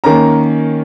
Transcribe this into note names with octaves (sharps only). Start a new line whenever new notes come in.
D#3 A#3 C#4 A#5